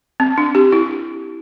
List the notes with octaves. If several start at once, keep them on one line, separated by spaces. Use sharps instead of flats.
C4
D4
G4
E4